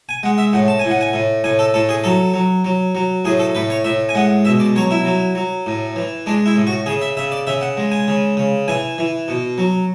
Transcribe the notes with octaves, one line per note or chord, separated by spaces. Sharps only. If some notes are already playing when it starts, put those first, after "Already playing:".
G#5
G#3 F#5
E5
A2 F#5
A5
A2 G#5
F#5
G#5
A2
A2 G#5
A4
A2 A4
G#4
F#3 A4
F#3
F#3
F#3
A2 G#4
A4
A2 B4
C#5
A2 E5
G#5
G#3 F#5
B2 E5
D5
F#3 C#5
E4
F#3
F#3
A2
E3
G#3 D4
E4
A2
F#4
C#3 G#4
E5
C#3 E5
D5
C#3 E5
F#5
G#3
G#5
C#3
C#3
E3 G#5
E3
B2
F#3